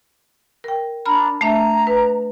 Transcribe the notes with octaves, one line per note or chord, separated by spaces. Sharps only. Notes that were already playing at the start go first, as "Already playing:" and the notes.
A#4 G5
D4 A#5 B5 F6
A3 D4 E5 A#5
B4